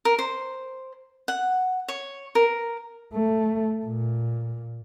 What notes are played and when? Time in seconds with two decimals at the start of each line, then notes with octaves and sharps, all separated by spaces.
0.05 A#4
0.19 C5
1.28 F#5
1.88 C#5
2.35 A#4
3.13 A3
3.85 A#2